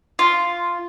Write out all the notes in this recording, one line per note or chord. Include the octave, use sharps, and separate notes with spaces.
F4